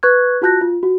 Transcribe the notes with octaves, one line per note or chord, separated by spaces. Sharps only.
B4 C#6 F#6 G#6
F4 F#4 A5 F#6 G6 A#6
F4
F#4